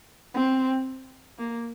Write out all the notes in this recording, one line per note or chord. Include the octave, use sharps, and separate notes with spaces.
C4
A#3